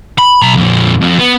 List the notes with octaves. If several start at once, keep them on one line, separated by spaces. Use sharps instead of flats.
B5
B1 A#5
F2 A#2
F2
B3